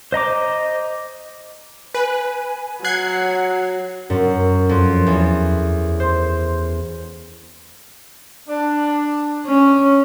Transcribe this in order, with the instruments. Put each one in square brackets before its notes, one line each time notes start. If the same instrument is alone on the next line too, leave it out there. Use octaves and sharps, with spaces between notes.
[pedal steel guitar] C5 D#5 A#5 D6
[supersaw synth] B4 [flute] G#5
[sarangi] F#3 [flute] F#5 [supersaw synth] F#6 G#6 C7
[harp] F#2
F2
E2
C5
[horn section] D4
[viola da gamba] C#4